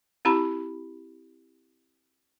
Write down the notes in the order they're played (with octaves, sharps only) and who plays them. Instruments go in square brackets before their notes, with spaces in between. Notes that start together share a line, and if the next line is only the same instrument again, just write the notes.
[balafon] C4 E4 G4 A#5 B5